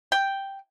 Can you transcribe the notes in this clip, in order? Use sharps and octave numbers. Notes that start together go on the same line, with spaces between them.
G5